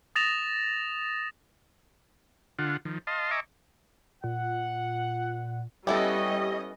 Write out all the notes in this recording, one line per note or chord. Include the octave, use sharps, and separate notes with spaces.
D#6 A6 A#6 E7 F7
D3 F4 F#5
D#3 F3
D#5 F5 A5 C6
D#5 E5 G#5 A#5 C#6 D6
A#2 F#5
G3 B3 C#4 E4 G4 A4 D#5